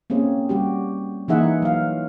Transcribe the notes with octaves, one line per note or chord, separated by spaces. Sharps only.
A#3 C4 C#4 G#4
G3 F#4 G4
E3 A#3 D#4 G#4 E5 F#5
F#3 F5